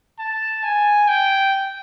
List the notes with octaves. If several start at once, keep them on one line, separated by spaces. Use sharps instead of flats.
A5
G#5
G5